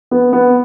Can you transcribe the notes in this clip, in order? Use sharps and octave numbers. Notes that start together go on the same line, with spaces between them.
B3
B3